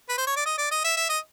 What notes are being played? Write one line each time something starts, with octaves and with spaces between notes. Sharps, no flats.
B4
C5
C#5
D5
D#5
D5
D#5
E5
E5
D#5